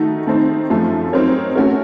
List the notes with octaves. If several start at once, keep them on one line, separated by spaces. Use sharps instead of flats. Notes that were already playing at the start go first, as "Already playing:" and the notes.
Already playing: D#3 A3 D#4 F#4
D#3 A3 C4 D#4
F#2 F3 A3
F#3 C4 D#4 A#4 C#5
A3 C#4 F#4 A#4